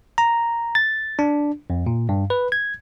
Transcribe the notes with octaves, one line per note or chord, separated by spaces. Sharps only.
A#5
A6
D4
F2
A#2
G2
B4
G#6